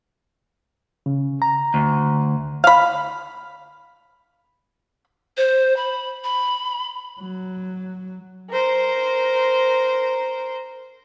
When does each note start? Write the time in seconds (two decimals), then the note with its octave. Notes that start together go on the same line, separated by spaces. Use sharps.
1.06 C#3
1.42 A#5
1.74 D2
2.64 F5 B5
5.37 C5
5.76 B5
6.24 B5
7.21 F#3
8.51 A#4 C5